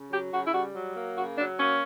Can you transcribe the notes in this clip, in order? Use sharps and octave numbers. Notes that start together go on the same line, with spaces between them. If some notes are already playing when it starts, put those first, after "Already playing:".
Already playing: C#3
F#3 G4
C#3 F#4
E4
G3 F#4
F#3
A#3
C#3 F#4
F#3 D4
A#3 C#4